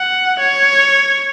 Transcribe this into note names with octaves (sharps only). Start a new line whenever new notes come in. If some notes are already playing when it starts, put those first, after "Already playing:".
Already playing: F#5
C#5